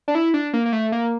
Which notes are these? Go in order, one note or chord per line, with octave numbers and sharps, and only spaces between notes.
D4
E4
D4
A#3
A#3
A3
A#3